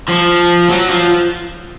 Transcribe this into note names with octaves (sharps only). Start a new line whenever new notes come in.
F3
F#3
F3